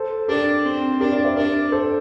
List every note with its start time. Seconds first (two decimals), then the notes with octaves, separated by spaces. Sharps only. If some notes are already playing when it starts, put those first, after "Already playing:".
Already playing: A4 C5
0.28 D4 G4 A#4
0.65 C4
1.00 D4 G4 A#4
1.12 A#4 D5
1.24 C5 E5
1.36 D4 A#4 D5
1.72 A4 C5